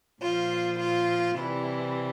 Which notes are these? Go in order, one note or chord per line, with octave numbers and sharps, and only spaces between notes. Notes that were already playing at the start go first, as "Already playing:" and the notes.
A#2 F3 F4
F4
C3 E3 G3 E4